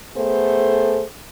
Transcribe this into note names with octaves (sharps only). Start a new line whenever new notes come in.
A3 B3 G#4 A4 C5